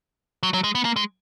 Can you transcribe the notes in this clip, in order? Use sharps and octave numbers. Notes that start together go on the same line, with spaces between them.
F#3
F#3
G#3
B3
A#3
G#3